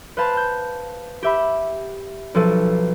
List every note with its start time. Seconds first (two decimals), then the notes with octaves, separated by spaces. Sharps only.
0.17 B4 C5 F5 A5 B5
0.37 G6
1.23 G4 E5 B5
2.34 B1 F3 A4 D#7